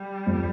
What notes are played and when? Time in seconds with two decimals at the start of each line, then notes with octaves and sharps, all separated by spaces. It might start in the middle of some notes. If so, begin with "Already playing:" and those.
Already playing: G3
0.27 F2